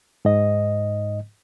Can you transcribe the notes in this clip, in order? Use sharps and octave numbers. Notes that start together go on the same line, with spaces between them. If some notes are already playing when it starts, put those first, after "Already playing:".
G#2 D#5